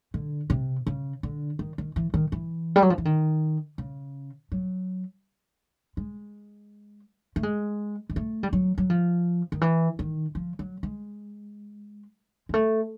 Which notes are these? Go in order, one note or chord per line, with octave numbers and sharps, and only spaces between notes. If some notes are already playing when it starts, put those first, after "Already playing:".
D3
C3
C#3
D3
D#3
D#3
E3
D#3
E3
G3
F#3
F3
E3
D#3
C#3
F#3
G#3
A3
G#3
G#3
A3
G3
F#3
F#3
F3
D#3
E3
D#3
F3
F#3
G#3
G#3
A3